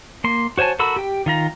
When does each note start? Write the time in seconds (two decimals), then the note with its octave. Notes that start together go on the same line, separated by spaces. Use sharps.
0.24 A#3 C6
0.58 F#4 C5 C#5 G#5 A5
0.79 F#4 A4 A#4 B5 E6
0.96 G4 G5
1.26 D#3 F4 A#5